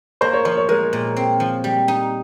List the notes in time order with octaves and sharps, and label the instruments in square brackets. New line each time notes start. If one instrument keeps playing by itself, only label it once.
[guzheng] A#3 [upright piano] C5
[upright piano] C#5
[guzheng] F3 [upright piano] C5
[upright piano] C#5
[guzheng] G#3 [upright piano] A#4
[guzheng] A#2
C4
F3
G3
D#4